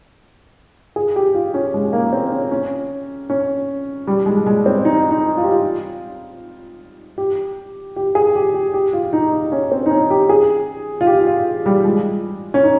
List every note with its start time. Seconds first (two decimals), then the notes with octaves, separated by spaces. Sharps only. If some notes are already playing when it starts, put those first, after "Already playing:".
0.96 G#4
1.16 G4
1.34 F4
1.54 C#4
1.74 G#3
1.93 A#3
2.13 C4
2.33 C#4
2.51 C#4
3.30 C#4
4.07 G3
4.26 G#3
4.46 G#3
4.66 C4
4.85 D#4
5.11 D#4
5.37 F4
5.44 G4
5.52 F4
7.18 G4
7.96 G4
8.15 G#4
8.35 G4
8.54 G4
8.74 G4
8.93 F4
9.13 D#4
9.32 D#4
9.52 C#4
9.72 C4
9.86 D#4
9.91 C#4
10.10 G4
10.29 G#4
11.01 F4
11.07 G4
11.27 F4
11.66 G3
11.85 G#3
12.54 C#4
12.63 D#4